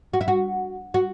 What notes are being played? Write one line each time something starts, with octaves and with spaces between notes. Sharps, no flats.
F#4
E4
F#4
F#4